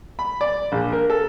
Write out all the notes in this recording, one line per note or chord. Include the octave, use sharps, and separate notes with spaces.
B5
D5
A#1
A#4
A4